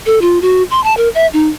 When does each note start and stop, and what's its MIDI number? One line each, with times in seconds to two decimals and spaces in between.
0.06 0.19 69
0.22 0.41 65
0.42 0.63 66
0.71 0.83 84
0.84 0.96 81
0.97 1.09 70
1.15 1.27 76
1.33 1.48 63